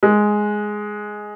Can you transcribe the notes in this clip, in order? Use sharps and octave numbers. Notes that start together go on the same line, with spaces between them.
G#3